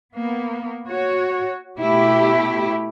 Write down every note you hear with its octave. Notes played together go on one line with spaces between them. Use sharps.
A#3 B3
F#4 C#5
B2 A3 E4 G4